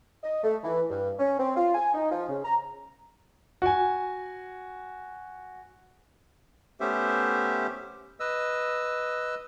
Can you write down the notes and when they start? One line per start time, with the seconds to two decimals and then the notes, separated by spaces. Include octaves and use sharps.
0.24 D#5
0.44 A3
0.64 E3
0.90 G2
1.19 C#4
1.39 C4
1.56 F4
1.75 G#5
1.94 D#4
2.11 F3
2.29 C#3
2.45 A#5
3.62 F#4 G#5
6.80 A3 B3 C#4 G4 C5 E5
8.20 B4 D#5 E6